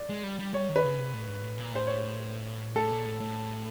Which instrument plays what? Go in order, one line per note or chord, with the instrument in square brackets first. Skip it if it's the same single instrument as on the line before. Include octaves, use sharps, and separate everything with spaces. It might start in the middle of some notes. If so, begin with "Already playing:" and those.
Already playing: [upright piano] D5
[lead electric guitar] G#3
G3
G3
[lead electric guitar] G3 [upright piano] C#5
[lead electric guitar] D#3
[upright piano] B4
[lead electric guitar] C#3
C3
A2
G#2
A2
A#2
[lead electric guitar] A2 [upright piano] C5
[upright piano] C#5
[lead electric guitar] A2 [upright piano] A4
[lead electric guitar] A#2
A2
A2